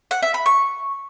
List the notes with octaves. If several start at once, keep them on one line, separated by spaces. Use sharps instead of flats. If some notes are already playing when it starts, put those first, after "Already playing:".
F#5
E5
B5
C#6